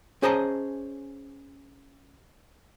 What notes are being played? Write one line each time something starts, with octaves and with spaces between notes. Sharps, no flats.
C#4 G#4 C5 D#5 A5 A#5